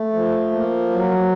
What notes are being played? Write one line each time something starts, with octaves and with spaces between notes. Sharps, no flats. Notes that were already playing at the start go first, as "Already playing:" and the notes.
Already playing: A3
F3
A#3
F#3